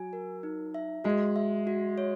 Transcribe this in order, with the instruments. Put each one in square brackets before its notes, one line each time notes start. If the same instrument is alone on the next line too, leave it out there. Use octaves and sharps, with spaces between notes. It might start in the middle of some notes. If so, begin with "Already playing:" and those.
Already playing: [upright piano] F#3 [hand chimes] G#5
[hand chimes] A#4
D#4
E5
[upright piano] G#3 [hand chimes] F#4
[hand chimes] E5
F#4
C#5